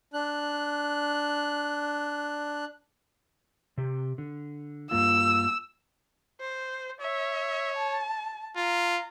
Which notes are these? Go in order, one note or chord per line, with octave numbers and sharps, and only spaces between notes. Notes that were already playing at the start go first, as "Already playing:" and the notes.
D4 F#6
C3 G4
D3
G2 A#3 F4 E6
C5
C#5 E5
A5
F4 A#5